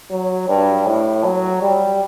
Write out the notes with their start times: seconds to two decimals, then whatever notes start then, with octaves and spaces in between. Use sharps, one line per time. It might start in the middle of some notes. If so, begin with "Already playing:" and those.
0.11 F#3
0.49 G2
0.86 A2
1.24 F#3
1.62 G3